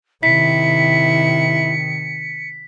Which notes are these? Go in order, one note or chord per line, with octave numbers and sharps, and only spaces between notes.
C3 D#3 E4 B6 C#7